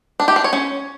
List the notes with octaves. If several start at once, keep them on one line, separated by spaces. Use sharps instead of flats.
D4
G4
D4
C#5
C#4